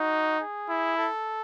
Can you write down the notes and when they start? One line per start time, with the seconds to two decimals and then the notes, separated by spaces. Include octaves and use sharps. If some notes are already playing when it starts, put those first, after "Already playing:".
Already playing: D#4 F#4
0.40 G#4
0.69 E4
0.98 A4